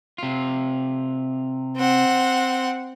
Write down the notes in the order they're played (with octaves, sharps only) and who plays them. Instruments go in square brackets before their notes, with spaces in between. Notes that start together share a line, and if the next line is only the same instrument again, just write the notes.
[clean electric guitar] C3 F4
[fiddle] C4 F#5